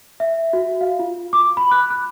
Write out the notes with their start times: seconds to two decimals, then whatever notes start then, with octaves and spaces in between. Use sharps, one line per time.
0.20 E5
0.53 F#4
0.81 F5
0.99 F4
1.33 D6
1.57 B5
1.71 F#6
1.91 F#6